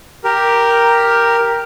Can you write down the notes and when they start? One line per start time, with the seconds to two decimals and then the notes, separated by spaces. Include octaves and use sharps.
0.24 G4 A#4